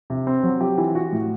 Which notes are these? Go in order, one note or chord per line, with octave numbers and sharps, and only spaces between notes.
C3
C4
F#3
G4
E3
F#4
A2